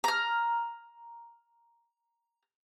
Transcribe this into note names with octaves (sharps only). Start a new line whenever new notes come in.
A#5 F6